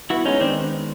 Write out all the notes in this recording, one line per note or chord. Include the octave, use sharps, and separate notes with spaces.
B3 E4 F#4
G#3 C#4 D#4
D#3 C4 D4